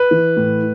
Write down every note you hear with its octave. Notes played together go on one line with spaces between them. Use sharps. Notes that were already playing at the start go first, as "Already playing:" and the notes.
Already playing: B4
E3
A2